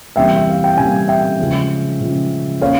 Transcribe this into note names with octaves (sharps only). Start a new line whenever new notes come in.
C3 E3 G3 A#3 E5 G5
E5
F5
G5
C3 E3 G3 A#3 F5 G#5
E5 G5
C#3 F3 G#3 C#4
C#3 F3 G#3 C#4
A#3 C#4 C#5 F5